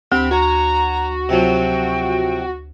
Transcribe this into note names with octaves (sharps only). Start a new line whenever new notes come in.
D2 C4 G4 B5
F#4 C#5 A#5
C3 F3 F#3 G5